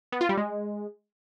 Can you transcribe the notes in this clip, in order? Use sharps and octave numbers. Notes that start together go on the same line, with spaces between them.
B3
F4
G3
G#3